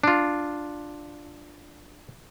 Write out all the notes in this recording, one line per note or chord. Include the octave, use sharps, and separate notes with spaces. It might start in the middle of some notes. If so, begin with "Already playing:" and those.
D4 F4